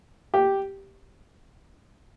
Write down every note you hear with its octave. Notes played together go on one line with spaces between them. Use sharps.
G4